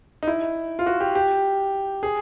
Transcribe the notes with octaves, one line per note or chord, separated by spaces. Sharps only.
D#4
E4
F4
F#4
G4
G4
G#4